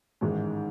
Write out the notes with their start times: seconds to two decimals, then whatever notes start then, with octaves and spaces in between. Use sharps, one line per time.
0.21 A1 G#2 D#3 G#3